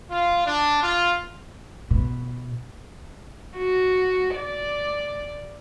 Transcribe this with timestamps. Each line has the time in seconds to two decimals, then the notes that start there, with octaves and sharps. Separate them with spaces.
0.11 F4
0.46 D4
0.83 F4
1.91 B2
3.57 F#4
4.35 D5